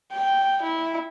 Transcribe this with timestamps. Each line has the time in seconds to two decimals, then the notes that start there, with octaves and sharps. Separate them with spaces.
0.12 G5
0.62 E4